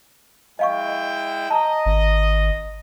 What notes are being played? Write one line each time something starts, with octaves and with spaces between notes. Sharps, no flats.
G#3 E4 D#5 F5 G5 C#6
D#5 A5 A#5
G#1